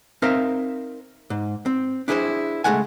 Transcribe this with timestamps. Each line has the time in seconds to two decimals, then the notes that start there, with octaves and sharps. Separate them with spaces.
0.22 C4 D#4 A#4 C5 E5 F5
1.30 G#2
1.66 C4
2.08 D4 E4 G#4 A4 C5
2.64 C#2 F3 G#3 A3 F#5 G#5